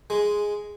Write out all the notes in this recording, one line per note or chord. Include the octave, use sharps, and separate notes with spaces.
G#3